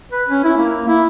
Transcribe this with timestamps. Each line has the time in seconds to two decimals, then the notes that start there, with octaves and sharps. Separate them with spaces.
0.12 B4
0.29 C#4
0.44 E4
0.57 A#3
0.88 E4